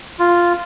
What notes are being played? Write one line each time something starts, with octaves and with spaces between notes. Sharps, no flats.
F4